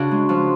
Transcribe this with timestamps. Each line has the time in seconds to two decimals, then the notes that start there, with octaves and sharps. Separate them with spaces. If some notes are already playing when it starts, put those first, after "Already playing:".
Already playing: C#3 D4 F#4
0.11 G#3
0.29 F3